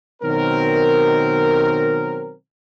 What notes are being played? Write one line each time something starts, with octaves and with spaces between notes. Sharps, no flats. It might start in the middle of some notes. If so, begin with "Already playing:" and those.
B2 D#3 F#3 C4 A#4